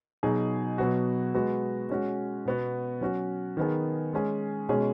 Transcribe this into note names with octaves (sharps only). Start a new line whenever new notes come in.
B2 F#3 D#4 G#4
B2 F#3 B3 F#4
G#3 B3 F#4
G#3 C#4 F#4
B2 B3 F#4
F#3 C#4 F#4
D#3 B3 G#4
G#3 C#4 G#4
B2 G#3 C#4 G#4